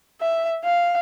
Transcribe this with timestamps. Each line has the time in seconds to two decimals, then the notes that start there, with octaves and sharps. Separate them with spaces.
0.21 E5
0.64 F5